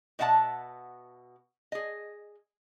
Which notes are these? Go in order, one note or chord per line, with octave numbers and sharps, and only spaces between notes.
B2 D#5 E5 F#5 G5 A5
G#4 D#5